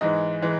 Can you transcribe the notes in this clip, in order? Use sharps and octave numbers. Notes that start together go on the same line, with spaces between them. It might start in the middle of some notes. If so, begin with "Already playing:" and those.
G#2 E3 G#3 D#5
E3 G#3